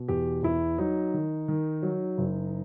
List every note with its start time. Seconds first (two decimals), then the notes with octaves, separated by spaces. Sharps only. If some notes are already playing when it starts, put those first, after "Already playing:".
Already playing: B2
0.08 E2 G4
0.43 E2 E4
0.78 F#3 D#4
1.14 D#3
1.48 D#3
1.82 F#3
2.18 F#1